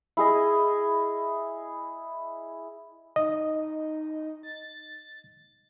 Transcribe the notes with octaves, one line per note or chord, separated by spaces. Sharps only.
E4 G#4 D#5
D#4 D#5
A6